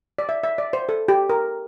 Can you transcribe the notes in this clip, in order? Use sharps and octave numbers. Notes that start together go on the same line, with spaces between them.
D5
E5
E5
D5
C5
A4
G4
A#4